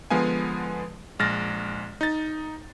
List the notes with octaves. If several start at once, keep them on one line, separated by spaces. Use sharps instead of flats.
D3 F3 G#3 B3 F5 G#5
A#1 G#3 F6 A6 A#6
D#4 A6